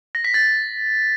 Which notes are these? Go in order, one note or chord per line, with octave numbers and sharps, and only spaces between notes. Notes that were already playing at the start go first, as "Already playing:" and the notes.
A#6
B6
A6